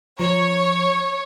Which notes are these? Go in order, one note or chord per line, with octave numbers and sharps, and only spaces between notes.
F3 C#5 A#5